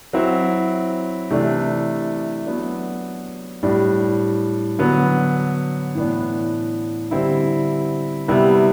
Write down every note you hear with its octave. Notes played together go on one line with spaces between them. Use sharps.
F#3 C4 E4
C3 E3 A3 D4
F#3 B3 D4
A2 G3 D4
D3 F#3 B3
A2 E3 B3 D4
D3 G3 C4 E4
C3 G3 B3 E4